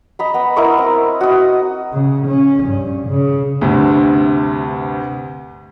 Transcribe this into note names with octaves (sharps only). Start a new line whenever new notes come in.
D#5 A#5 B5
B3
E4 A#4 D#5 C#6
C4
F#4 D#5
C#3
C#4
G2
C#3
D2 G2 C3